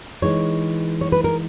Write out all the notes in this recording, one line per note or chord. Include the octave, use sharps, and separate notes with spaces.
E3 G#3 D#4 C#5
C#5
B4
A#4